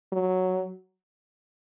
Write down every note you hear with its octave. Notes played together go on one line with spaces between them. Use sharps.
F#3